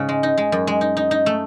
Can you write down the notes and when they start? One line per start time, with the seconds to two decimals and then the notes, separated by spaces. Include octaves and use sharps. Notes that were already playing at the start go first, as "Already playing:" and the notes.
Already playing: G#2 C#3
0.09 G#3
0.23 D#4
0.38 G#3
0.52 F#2
0.67 G#3
0.81 D#4
0.97 D#4
1.11 D#4
1.26 A3